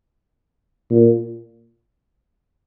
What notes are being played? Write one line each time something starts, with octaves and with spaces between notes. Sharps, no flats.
A#2